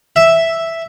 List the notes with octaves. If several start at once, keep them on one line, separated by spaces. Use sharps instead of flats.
E5